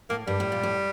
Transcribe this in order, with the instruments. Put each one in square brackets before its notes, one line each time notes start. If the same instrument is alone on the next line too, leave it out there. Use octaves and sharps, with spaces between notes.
[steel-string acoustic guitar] A2 [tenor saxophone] A#3
[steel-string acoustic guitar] G2 [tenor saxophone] G3
[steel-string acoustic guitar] A2
A#2
A2